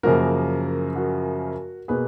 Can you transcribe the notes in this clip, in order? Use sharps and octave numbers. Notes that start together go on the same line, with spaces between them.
F#2 C#3 F3 A#3 F#4 A#4
F#4 A#4
B2 A#3 G#4 B4